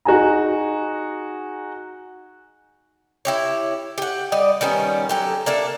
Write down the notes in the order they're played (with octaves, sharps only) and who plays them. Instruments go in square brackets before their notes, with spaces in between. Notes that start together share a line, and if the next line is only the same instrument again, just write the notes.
[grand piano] D#4 F#4 G#4 G#5 A#5
[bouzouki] E4 G4 C#5
G4 F#5
G3 D5 D#5
D#3 G3 B3 C#4
F#3 G4 A4
A#3 D4 A4 E5